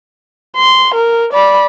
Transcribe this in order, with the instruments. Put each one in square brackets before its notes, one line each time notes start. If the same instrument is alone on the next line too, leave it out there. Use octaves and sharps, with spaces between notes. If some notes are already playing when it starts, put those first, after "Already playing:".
[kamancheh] C6
A#4
D5 B5